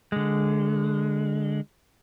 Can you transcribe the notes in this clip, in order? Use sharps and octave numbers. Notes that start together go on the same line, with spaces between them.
D3 G#3